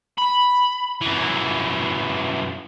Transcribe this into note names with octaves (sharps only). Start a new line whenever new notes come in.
B5
F#2 E3